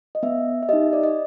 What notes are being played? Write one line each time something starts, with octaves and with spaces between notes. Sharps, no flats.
D#5
B3 E5
E5
D#4 G4 D#5
D5
D#5